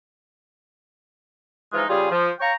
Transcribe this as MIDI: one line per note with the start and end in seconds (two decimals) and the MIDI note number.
1.73 1.84 52
1.73 1.84 53
1.73 1.84 56
1.73 1.84 63
1.73 1.84 65
1.89 2.07 49
1.89 2.07 55
1.89 2.07 65
1.89 2.07 68
2.11 2.30 53
2.40 2.51 73
2.40 2.51 77
2.40 2.51 79
2.40 2.51 82
2.40 2.51 85